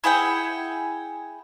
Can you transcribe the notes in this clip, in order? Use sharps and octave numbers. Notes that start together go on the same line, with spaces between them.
E4 G#4 F#5 G5